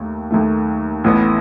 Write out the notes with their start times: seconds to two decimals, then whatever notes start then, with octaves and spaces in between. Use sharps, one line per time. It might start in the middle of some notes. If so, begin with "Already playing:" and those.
Already playing: D#2 D#3 A3
0.31 D#2 D#3 A3
1.04 A1 A2 E3 B3